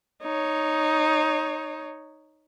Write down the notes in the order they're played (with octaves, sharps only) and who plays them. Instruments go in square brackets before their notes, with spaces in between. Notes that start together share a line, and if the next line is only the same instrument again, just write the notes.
[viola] D#4 C#5